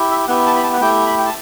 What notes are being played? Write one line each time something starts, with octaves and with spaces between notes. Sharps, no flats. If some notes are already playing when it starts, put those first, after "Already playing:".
Already playing: E4 G4
E5
B3 E4 G4 F#5
A5
B5
A5
F#5
A3 E4 G4 G5
B5
G5
A5